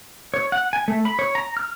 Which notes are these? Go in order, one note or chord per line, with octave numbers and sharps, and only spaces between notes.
C#5
F#5
G#5
A3
B5
C#5
A#5
F6